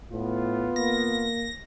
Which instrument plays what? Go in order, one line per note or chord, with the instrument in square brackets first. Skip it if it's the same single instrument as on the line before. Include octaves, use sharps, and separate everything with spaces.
[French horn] A2 [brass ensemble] B3 F4
[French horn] A#3 [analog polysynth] A#6